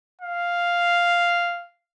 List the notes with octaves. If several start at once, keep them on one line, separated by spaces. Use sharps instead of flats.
F5